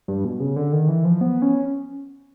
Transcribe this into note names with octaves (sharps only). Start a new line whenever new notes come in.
G2
B2
C#3
D3
D#3
E3
F3
B3
C#4